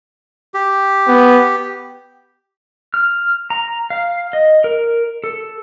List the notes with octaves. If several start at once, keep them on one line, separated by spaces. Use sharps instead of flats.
G4
B3
F6
A#5
F5
D#5
A#4
A4